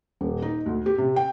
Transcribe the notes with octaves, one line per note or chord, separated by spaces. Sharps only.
D#1
D#4
D2
G4
C3
G5